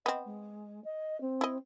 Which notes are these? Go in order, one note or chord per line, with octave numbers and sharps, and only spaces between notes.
B3 C4 D#5
G#3
D#5
C4
E4 D#5